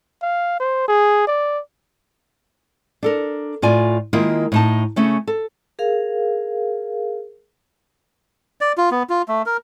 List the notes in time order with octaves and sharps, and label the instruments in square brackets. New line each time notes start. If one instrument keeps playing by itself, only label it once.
[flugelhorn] F5
C5
G#4
D5
[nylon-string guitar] D4 A4 A#4
A2 F4 D5 G#5
D#3 G#3 A#3 E4 F4
A2 D#4 A5
C#3 A3 C#4
A4
[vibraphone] G#4 A#4 F5
[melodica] D5
F4
B3
F4
A3
A#4